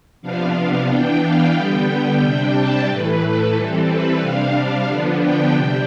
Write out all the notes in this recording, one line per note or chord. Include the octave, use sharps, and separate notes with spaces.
C3 F3 B3 D4 F5
E3 B3 D4 G5
F5
D3 G3 B3 G5
C3 G3 D4
A5
A2 E3 A3 B4
A4
E3 G3 C4
B4
C3 G3 D4 F5
D3 F3 B3 D4
G5
C3 G3 D4 G5